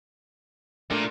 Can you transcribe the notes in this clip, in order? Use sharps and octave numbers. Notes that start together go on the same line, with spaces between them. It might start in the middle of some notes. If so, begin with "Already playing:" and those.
A#2 A3 D4